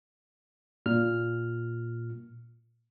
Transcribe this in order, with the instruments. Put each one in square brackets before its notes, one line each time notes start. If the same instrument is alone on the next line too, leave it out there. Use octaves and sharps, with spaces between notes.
[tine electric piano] A#2 F6